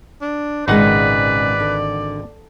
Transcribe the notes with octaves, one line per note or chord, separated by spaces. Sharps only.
D4
G#1 A#2 C#3 G#3 D#4 B4 D5 F#5
D3